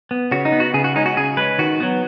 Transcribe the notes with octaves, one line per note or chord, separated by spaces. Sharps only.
B3
C#3 F#4
D#4
B3
F#4
C#3 G#4
F#4
G#3 C#4 D#4
F#4
C#3 G#4
G#3 C#4 B4
D#3 F#4
F#3 B3